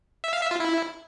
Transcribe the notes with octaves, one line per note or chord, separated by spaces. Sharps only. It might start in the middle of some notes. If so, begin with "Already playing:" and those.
E5
F5
E5
F4
E4